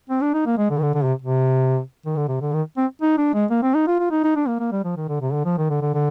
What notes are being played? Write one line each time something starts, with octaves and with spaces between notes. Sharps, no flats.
C4
D4
D#4
A#3
G#3
D3
D#3
D3
D3
C3
C3
D#3
D3
C3
D3
D#3
C4
D#4
D4
G#3
A#3
C4
D#4
F4
F4
D#4
D#4
D4
A#3
A#3
G3
F3
D#3
D3
C3
D3
F3
D#3
D3
D3
D3